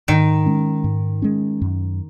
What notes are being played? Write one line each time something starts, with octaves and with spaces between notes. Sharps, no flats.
G#2 D#3
G#3 C#4
G#2
G#3 C#4
F#2